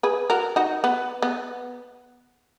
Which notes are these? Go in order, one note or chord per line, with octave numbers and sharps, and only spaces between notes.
G#4 B4
F#4 A#4
D#4 F#4
B3
B3